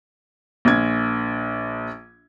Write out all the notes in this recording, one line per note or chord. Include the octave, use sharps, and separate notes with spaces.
A#1 G#6